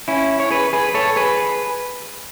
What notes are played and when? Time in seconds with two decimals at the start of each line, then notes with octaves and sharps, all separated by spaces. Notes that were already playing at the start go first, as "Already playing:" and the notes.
0.08 C#4 E4
0.40 C#5
0.51 G#4 B4
0.73 G#4 B4
0.94 A4 C#5
1.16 G#4 B4